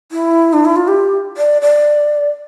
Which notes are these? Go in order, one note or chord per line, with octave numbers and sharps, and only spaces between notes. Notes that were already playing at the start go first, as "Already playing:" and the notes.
E4
D4
E4
F4
G4
D5
D5